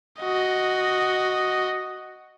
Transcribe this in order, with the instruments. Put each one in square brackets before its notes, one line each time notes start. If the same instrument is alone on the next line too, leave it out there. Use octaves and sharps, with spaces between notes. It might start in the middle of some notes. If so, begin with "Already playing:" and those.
[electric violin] F#4 D#5